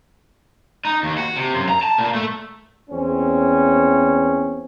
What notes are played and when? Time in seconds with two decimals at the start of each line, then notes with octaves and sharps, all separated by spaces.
0.85 D#4
1.03 D#2
1.18 F#4
1.36 C3
1.54 F#2
1.69 A#5
1.83 A5
1.98 A#2
2.15 A3
2.89 E2 C4 C#4